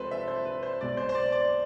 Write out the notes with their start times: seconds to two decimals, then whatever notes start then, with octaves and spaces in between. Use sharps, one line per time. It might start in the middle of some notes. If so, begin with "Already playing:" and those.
Already playing: C2 C3 F3 G#3 A4 B4 C5
0.11 E5
0.27 C5
0.45 B4
0.63 C5
0.81 B1 B2 G#3 D5
0.97 C5
1.09 C5
1.15 D5
1.32 D5